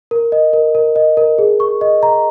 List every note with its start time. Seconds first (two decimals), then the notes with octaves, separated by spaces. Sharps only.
0.11 A#4
0.32 D#5
0.53 A#4
0.75 A#4
0.96 D#5
1.17 A#4
1.38 G#4
1.60 C#6
1.81 D#5
2.03 A#5